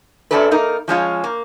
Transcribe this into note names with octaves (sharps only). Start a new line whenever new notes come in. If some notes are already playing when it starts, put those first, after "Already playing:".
F#2 C#3 F#3 D4 A4 B4
A#3 D#4 A#4
F3 G#3 C#4 F4
A#3